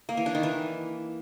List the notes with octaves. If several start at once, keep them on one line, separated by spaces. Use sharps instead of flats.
A#3
E3
D4
D#3
E3